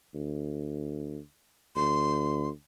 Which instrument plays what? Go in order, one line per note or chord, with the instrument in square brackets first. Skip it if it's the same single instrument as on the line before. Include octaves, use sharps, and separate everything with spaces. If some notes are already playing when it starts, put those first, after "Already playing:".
[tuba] D2
[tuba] D2 [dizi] C6